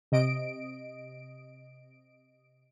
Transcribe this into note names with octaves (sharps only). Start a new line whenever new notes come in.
C3 D#5 D7